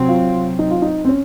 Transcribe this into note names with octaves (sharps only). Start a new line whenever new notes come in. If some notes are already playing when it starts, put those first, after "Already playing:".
Already playing: C3 F#3 C4
F4
D#4
F4
D#4
C4
C#4